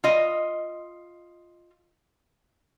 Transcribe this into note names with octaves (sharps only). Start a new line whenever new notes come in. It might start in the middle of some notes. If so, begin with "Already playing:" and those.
F4 D#5